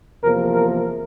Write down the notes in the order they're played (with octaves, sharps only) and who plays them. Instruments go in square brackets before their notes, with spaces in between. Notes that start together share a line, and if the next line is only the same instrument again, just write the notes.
[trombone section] E2 C3 F3 A#3 A#4
A#4